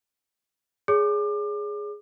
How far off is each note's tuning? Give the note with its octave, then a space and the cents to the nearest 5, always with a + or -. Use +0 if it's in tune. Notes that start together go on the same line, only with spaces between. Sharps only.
G#4 +0 C#5 +35 D6 +30